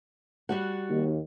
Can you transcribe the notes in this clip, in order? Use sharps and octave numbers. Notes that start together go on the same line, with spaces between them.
G3 F#4 F#5
D#2